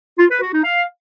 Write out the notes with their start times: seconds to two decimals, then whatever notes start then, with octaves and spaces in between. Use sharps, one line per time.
0.18 F4
0.29 B4
0.41 F#4
0.52 D#4
0.64 F5